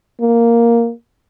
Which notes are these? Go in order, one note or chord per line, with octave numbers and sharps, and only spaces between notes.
A#3